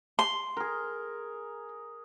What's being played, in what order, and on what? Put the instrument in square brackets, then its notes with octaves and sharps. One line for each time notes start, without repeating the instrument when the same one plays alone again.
[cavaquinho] C6
[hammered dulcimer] G#4 A#4